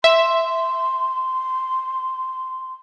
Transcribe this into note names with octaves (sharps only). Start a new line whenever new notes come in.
E5 C6